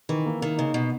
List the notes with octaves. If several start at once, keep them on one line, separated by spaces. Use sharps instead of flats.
D#3 E3
A#3
D#3 A#3
C#3 D#4
B2